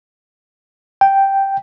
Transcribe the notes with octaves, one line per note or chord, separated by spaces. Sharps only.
G5